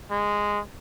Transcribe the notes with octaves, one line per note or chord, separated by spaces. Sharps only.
G#3